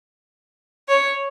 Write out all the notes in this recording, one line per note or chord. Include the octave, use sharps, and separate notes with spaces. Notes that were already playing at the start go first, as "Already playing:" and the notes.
C#5